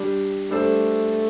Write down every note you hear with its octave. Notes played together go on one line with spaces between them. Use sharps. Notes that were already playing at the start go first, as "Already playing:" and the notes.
Already playing: G3 D4 G4
G3 A3 D4 A4 C5